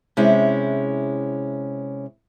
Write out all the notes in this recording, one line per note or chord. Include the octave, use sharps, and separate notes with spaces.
C3 G#3 C#4 E4